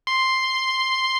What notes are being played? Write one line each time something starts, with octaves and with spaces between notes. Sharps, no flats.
C6